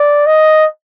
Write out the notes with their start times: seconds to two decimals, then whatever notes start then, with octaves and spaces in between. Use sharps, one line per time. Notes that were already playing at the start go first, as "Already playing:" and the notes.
Already playing: D5
0.27 D#5